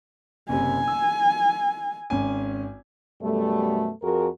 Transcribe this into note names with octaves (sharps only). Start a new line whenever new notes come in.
F#1 C3 G#5
E6
G#1 C#4 G#5
F#2 B2 G3 A3
F2 F#4 G#4 A#4